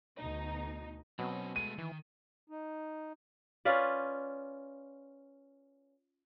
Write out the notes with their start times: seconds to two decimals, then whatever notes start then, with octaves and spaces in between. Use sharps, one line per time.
0.17 D2 B2 D#4
1.19 B2 F#3 C4 C#4
1.56 G#3 A3 D#7
1.78 D#3 E3
2.49 D#4
3.65 C#4 F4 B4 D5